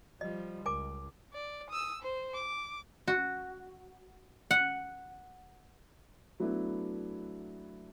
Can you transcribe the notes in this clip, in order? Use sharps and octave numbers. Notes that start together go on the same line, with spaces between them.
F3 G3 D#5
C#2 A#4 G#5 D6
D5
D#6 E6
C5
D6
F#4
F#5
F#3 A3 B3 D4 E4